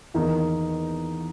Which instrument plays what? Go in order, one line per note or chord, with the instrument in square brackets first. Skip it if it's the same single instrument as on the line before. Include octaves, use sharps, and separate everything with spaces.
[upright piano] E2 D#3 A#3 D#4